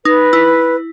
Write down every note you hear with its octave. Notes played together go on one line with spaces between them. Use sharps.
D#4 B4
E4